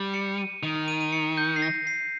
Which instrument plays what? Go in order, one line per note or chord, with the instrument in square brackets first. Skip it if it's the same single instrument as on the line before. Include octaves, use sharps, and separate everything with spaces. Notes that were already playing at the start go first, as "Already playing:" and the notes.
Already playing: [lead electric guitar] G3
[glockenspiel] C#7
D#7
[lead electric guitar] D#3 [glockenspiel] F7
[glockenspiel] D#7
D#7
C#7
G6
C7
A#6
C7